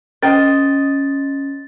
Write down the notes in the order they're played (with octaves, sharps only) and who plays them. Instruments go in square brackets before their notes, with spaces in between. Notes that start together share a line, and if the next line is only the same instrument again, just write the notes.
[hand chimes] C#4 [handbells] A#4 G5 [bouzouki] C5 D#5 [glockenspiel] A6